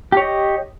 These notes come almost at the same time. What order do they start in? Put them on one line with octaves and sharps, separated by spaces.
G4 C#5 D#5